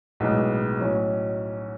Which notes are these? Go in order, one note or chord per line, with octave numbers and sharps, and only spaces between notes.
B1 A2 G#3 B3
A2 F#3 C#4